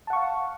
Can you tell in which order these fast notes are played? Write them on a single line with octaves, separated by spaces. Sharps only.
A5 F#5 C#6 F5